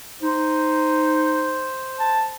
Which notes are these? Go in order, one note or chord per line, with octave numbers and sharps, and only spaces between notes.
D#4 C5
A5